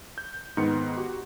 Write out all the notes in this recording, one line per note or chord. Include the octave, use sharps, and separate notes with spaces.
G6
G#2 D#3 B3 C#7
F#4 G4